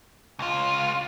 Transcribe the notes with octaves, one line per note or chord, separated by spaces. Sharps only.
C#2 F4